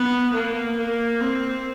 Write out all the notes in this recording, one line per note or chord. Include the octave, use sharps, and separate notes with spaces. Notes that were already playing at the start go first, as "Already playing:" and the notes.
Already playing: B3
A#3
A#3
C4